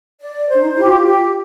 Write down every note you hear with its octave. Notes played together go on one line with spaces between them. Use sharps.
D5
C5
D4
D#4
E4 G4
F#4
F4
G4